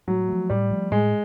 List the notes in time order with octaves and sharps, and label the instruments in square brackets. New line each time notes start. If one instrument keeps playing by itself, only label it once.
[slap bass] A2 [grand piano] F#3
[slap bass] F3 A3
[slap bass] A2 [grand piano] G3
[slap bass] F3 A3
[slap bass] A2 [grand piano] G#3